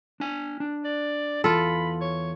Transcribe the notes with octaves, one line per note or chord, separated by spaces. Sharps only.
D4 G#5
D4
D5
E2 F4 A4 B5
C#5